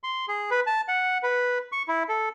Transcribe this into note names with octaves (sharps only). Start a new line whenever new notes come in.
C6
G#4
B4
A5
F#5
B4
C#6
E4
A4